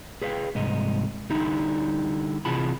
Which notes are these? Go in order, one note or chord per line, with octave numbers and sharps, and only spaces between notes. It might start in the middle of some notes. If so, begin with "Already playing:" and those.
G#4 B4 C5 E5 F5 G5
C2 G#2 D#5
D3 G3 D#4 E4
C3 E3 F4 G#4 A5 B5